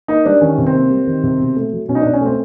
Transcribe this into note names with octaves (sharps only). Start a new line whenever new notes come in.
A#3 D#4
G3 D4
D#3 C#4
C3
C4
A#3
G3
D#3
C3
B2
A3
F#3
B2 C#4
D#4
D4
B2
C#4
A3 C4